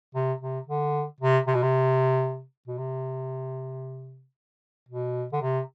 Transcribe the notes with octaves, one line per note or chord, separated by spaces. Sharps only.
C3
C3
D3
C3
C3
B2
C3
B2
C3
B2
D3
C3